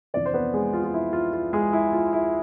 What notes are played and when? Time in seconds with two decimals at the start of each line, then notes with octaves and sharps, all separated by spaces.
0.14 F2 C3 E3 D4 D5
0.26 C5
0.34 B3 B4
0.54 G#3 G#4
0.73 F4
0.84 F4
0.94 E4
1.13 F4
1.33 F4
1.53 G#3 G#4
1.73 E4
1.93 F4
2.13 E4